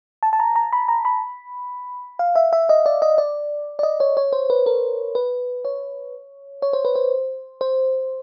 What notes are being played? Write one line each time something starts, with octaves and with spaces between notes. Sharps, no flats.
A5
A5
A#5
A#5
B5
A#5
B5
F5
E5
E5
D#5
D5
D#5
D5
D5
D#5
C#5
C#5
C5
B4
A#4
B4
C#5
C#5
C5
B4
C5
C5